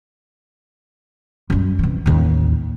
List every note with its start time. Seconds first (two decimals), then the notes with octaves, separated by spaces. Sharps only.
1.50 F#2 G3
1.79 C3 E3
2.06 A1 D#2